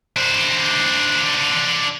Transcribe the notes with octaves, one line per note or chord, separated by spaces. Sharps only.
D4 C5